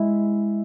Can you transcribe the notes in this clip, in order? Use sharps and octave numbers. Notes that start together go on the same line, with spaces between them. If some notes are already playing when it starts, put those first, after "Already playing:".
Already playing: G#3 E4